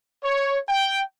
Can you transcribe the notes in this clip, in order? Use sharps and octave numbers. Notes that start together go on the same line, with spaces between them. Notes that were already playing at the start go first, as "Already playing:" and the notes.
C#5
G5